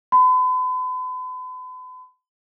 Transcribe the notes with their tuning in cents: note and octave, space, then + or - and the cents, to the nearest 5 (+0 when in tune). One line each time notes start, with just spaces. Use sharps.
B5 +40